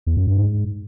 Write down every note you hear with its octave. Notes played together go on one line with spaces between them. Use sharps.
E2
F#2
G2
G#2